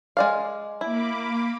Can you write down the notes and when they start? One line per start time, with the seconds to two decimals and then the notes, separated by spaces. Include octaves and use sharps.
0.17 G#3 D5 F5
0.81 A#3 E4 B5 D6